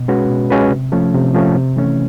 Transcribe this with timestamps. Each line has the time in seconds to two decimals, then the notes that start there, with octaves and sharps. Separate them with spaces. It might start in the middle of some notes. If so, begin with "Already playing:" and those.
Already playing: B2
0.08 G#3 C#4 F#4 B4
0.30 B2
0.50 G#3 C#4 F#4 B4
0.71 C3
0.92 F3 A3 C#4
1.14 C3
1.34 F3 A3 C#4
1.55 C3
1.76 E3 A3 C#4